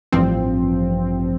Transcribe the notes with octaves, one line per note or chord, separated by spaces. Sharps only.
A1 G2 F3 C4